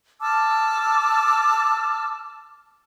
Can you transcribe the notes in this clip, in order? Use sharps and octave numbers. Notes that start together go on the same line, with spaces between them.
A5 D6 E6 F6